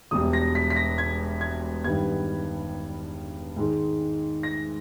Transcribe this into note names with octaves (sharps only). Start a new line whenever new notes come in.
E1 E2 B2 G3 D#6
A#6
B6
B6
A#6
G#6
G#6
G2 D#3 G3 B3 G#6
G#2 D#3 G#3 D#4
A#6